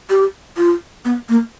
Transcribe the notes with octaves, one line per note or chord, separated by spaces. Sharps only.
G4
F4
B3
A#3